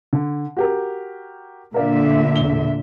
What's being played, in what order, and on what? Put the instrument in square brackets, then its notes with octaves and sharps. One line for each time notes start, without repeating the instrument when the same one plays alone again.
[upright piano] D3
F#4 G4 A#4
[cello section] A#2 D3 E5 [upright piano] A#4 D5 F5
[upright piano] E1 G7